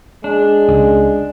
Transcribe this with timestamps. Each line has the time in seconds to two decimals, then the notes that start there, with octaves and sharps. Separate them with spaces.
0.24 G#3 D4
0.68 C#2